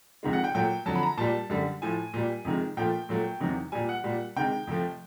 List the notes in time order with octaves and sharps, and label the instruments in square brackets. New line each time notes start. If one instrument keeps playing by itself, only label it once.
[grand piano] F2 C3 D#3 G#3
F#5
G5
A#2 F#3 A3 G5
F2 D3 F#3 A5
B5
A#5
A#2 G3 A5
F#2 D3 G3
A2 F3 A3 G#5
A#2 G3
F2 C3 D#3 G#3
A#2 F3 A3 G5
A#2 F#3 A3
E2 C3 D#3 F#3
A#2 G3 G#5
F#5
A#2 G3
C3 D#3 G#3 G5
F2 C3 F3 A3